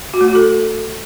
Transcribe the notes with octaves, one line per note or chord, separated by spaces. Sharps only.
F#4
A3
F#4
A4